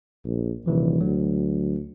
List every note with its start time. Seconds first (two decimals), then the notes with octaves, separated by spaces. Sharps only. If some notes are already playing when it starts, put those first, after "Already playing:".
0.25 A#1
0.66 D#1 C3 E3 F3
1.01 D2 F#3